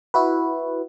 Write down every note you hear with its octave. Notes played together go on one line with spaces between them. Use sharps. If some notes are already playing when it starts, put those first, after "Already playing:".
E4 F#4 B4